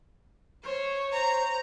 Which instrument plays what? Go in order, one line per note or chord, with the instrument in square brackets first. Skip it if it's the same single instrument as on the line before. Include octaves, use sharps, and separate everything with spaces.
[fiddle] C5 [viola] C#5
[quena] C5 [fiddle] A#5